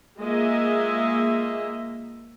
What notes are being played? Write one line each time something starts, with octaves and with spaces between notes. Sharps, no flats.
G#3 A#3 F4 G#4 D#5 E5